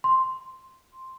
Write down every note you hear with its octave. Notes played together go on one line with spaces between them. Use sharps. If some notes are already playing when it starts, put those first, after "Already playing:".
C6